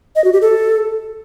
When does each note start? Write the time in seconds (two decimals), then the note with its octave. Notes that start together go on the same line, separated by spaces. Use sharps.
0.16 D#5
0.24 F#4
0.33 G4
0.42 A4